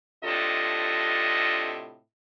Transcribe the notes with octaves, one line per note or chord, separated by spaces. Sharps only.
A2 C3 D4 F4 A4 D#5